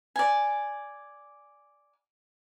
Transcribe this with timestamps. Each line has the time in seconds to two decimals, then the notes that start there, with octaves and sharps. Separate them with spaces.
0.16 D5 G#5